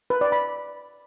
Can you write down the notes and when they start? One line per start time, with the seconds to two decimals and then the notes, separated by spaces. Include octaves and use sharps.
0.10 B4
0.21 D5
0.32 B5